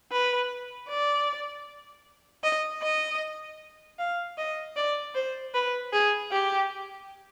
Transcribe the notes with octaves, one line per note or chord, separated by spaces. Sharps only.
B4
D5
D#5
D#5
F5
D#5
D5
C5
B4
G#4
G4